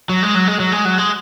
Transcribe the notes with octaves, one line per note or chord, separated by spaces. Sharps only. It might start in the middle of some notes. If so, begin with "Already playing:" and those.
F#3
G#3
F#3
G#3
F#3
G#3
F#3
G#3